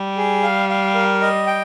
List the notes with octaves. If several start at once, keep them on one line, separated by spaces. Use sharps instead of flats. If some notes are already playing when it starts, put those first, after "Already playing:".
Already playing: G3
G#4
F5
F5
A#4
D#5
G5